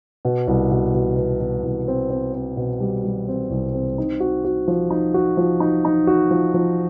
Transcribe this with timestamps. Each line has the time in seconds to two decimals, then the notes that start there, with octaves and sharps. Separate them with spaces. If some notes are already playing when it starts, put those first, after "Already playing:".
0.25 B2
0.48 C2
0.71 B2
0.94 B2
1.17 B2
1.41 B2
1.64 C2
1.88 C4
2.10 C4
2.34 C4
2.57 B2
2.80 G3
3.05 G3
3.28 C4
3.50 C2
3.74 C4
3.98 D#4
4.20 F#4
4.45 F#4
4.68 F3
4.90 D#4
5.14 F#4
5.37 F3
5.60 D#4
5.85 D#4
6.07 F#4
6.31 F3
6.54 F3